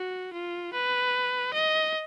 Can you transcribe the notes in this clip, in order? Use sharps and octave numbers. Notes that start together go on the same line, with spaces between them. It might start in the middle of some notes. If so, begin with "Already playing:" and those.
Already playing: F#4
F4
B4
D#5